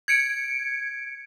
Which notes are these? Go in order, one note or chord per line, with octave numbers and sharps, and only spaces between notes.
G#6 C#7 D7